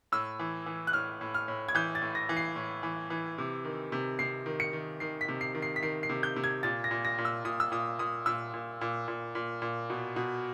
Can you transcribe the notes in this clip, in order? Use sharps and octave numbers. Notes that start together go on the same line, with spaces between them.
A2 E6
E3
E3
F#6
A2 F6
A2
F6
A2
G#6
E3 G6
A6
A2
A#6
E3
C7
A2
E3
E3
C3
D#3
C3
C3 C7
D#3
C#7
D#3
D#3 C7
B6
C3
C7
D#3
C7
B6
D#3 C7
C7
C3
G6
C3
G#6
A#2 A6
A#6
A#2
A#6
A#2
E6
A#2 D#6
E6
A#2 D#6
A#2 D#6
A#2 E6
A#2
A#2
A#2
A#2
A#2
B2
B2